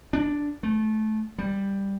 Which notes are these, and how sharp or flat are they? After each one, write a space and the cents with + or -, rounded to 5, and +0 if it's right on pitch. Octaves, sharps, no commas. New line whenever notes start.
D4 -5
A3 -20
G3 +5